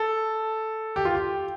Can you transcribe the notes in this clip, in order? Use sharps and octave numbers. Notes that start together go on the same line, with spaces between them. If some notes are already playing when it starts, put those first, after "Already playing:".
Already playing: A4
G4
F4
G4